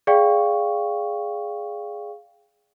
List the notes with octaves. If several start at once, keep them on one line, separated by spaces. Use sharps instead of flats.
G#4 D5 F5 G5 C#6